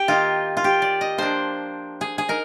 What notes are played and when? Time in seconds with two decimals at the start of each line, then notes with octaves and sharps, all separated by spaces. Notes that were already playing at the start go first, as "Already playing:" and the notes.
Already playing: G4
0.08 D#3 A#3 D#4 F4
0.57 F4
0.64 G4
0.82 D5
1.01 D#5
1.18 F3 A#3 D4 C5
2.01 G#4
2.18 G#4
2.29 D#4 A#4